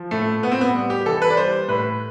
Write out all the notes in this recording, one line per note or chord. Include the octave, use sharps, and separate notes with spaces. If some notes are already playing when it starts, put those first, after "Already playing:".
Already playing: F3
A2 A3
A2 B3
C4
B3
G3
G4
E3 A4
B4
D5
G3 C5
A2 B4